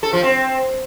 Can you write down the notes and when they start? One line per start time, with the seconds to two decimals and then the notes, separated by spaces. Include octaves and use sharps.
0.03 A4
0.13 F3
0.23 C4